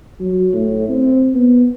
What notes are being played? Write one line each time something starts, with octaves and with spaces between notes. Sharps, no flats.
F#3
A2
C4
B3